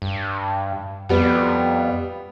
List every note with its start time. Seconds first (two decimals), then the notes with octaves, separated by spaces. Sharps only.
0.02 G2
1.09 F2 G3 B3